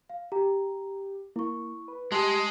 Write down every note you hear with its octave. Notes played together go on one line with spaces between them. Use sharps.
F5
G4 A#5
A#3 E4 C#6
B4
G#3 G4 G#4 A5 C6 C7